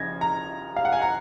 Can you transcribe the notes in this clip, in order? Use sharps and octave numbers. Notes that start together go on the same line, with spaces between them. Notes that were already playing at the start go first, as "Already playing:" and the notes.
Already playing: C#3 F3 G#6 A#6
A#5
F5
F#5
G#5
A#5